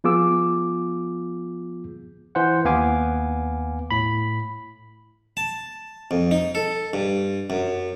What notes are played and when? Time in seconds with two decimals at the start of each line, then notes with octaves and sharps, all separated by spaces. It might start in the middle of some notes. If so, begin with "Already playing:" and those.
0.04 F3 B3 F4 G#4 D6 E6
2.35 E3 C5 F#5
2.65 D#2 B3 F5 G#5 D6
3.91 A2 B5
5.37 A5
6.11 F2
6.31 D#4
6.55 A4
6.93 G2
7.50 F#2